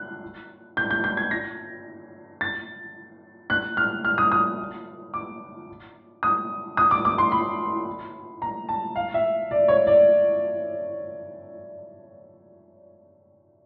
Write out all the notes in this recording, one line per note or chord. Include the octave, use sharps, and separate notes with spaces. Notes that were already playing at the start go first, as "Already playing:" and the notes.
Already playing: F#6
G6
G6
G6
G#6
A#6
A6
F#6
F6
F6
D#6
D#6
D6
D#6
D#6
D6
D6
C6
B5
A#5
A5
F5
E5
D5
C#5
D5